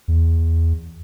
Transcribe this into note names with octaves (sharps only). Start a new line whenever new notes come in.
E2